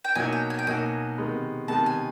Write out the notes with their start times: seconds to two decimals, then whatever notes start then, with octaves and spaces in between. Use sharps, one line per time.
0.04 G5
0.15 B2 F#3 A#3 D#4 F#4 G#5
0.33 G5
0.50 G#5
0.59 G5
0.67 B2 F#3 A#3 D#4 F#4 G#5
1.18 C3 D#3 G#3 B3
1.68 C3 D#3 G#3 B3 A5
1.86 G#5